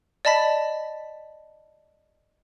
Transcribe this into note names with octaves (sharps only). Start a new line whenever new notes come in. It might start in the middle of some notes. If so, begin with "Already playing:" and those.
D5 D#5 A5 B5 B6